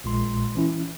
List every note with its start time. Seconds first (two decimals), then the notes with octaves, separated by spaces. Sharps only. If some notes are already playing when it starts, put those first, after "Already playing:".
0.04 A#1 A#2 G#3 C6
0.55 E3 C#4 E4